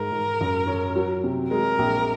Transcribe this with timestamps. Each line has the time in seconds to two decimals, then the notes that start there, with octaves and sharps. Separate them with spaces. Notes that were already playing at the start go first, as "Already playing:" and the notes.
Already playing: G#2 A#4
0.12 G#2
0.41 F#2
0.67 C#4
0.95 F#3
1.24 C3
1.50 G#3 A#4
1.79 A#1